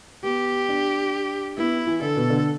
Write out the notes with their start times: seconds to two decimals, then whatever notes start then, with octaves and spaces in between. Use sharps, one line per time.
0.24 B3 G4
0.69 D4
1.57 B3 E4
1.87 E3
2.01 D3 A4
2.16 B2
2.30 D3